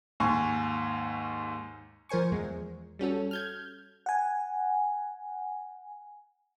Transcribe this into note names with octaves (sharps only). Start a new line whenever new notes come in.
D#2 G#2 G#5 C6 C#6
F3 A#4 C5 G#5 C#6
E2 G#3
G3 C#4 F#4 A4
F6 G6 G#6
F#5 G#5